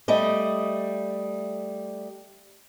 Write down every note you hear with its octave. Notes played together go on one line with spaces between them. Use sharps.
G3 A3 D#5